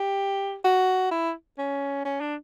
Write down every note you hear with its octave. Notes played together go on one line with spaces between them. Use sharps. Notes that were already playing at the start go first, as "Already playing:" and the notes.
Already playing: G4
F#4
E4
C#4
C#4
D4